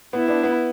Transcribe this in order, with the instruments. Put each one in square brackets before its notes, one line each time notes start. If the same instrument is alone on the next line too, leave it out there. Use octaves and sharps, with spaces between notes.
[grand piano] B3 [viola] E4
[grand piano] B3 D4
B3